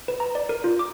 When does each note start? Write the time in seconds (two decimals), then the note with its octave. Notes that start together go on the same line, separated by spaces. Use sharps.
0.08 B4
0.20 A#5
0.35 D5
0.49 A#4
0.64 F4
0.79 D6